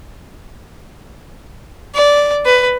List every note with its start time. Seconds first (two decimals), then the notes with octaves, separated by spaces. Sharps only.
1.95 D5
2.46 B4